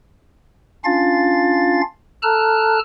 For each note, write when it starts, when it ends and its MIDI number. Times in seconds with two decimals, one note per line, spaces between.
0.85 1.81 61
0.85 1.81 62
0.85 1.81 65
0.85 1.81 77
0.85 1.81 93
2.23 2.79 69
2.23 2.79 81
2.23 2.79 82
2.23 2.79 89
2.23 2.79 90